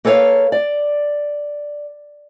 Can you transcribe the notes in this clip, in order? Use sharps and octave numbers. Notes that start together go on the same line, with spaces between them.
A#3 A4 B4 C#5 F5
D5